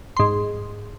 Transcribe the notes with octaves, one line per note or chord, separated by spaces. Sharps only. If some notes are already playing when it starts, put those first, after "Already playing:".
G#2 C6